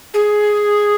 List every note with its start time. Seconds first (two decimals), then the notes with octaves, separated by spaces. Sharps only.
0.14 G#4